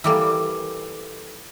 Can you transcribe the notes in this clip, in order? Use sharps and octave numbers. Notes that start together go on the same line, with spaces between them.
E3 G3 A#3 A4 D6 E6